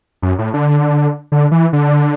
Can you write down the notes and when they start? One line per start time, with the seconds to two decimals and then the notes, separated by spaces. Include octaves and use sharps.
0.22 F#2
0.39 A2
0.54 D3
1.32 D3
1.52 E3
1.73 D3